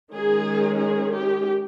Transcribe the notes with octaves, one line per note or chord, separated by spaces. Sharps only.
D#3 G#3 C#4 G#4
G#4
G4